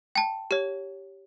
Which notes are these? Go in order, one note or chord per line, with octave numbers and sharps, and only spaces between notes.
G5 A5
G4 C#5